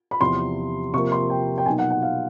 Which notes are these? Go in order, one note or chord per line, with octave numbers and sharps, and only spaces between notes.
B5
E2 C3 F3 C6
C3 F3 A#3 C#6
C6
G5
G5
B2 F#3 A#3 D#4 G#5
F#5
F#5
F5